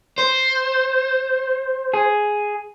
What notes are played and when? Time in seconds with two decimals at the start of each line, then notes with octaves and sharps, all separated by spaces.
0.18 C5
1.94 G#4